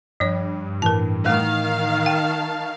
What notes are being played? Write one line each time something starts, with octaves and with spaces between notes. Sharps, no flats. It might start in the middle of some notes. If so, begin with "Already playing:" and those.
G2 F3 C#5
A2 E3 A#4 A5
D#3 A3 F5
G5 A5